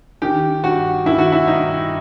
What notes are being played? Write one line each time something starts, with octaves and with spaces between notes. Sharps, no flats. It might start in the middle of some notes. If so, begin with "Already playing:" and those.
D#3 G4
G2 F#4
D#3 E4
F#4
E4
G2 D#4